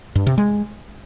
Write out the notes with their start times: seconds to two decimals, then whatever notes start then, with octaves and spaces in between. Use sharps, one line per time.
0.15 G2
0.27 C3
0.38 G#3